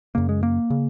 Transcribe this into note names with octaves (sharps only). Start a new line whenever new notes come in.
F#2 C#3 A#3
G#3
A#3
C#3